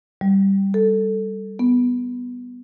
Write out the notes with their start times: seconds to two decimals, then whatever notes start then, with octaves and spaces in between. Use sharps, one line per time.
0.21 G3
0.74 A4
1.59 B3